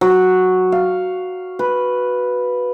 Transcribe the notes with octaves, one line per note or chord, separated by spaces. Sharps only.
F#3
F5
B4